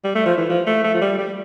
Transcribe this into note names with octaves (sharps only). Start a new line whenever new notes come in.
G3
A3
F3
E3
F3
A3
A3
F3
G3
G3